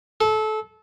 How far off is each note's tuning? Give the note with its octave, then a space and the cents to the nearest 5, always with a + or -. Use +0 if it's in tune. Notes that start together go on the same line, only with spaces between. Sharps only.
A4 -25